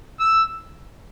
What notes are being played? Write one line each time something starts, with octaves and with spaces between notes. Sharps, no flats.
E6